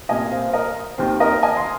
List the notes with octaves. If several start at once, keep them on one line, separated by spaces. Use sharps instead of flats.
C2 A#2 A#3 D#5 G#5
C5 F5
C5
A#4 D#5
D#2 D#3 C4 C5
A#4 D#5
D#5 G#5
C6